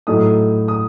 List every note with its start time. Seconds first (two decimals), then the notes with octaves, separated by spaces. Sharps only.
0.07 A2 F#3 A3 D#4 D#6
0.68 D#6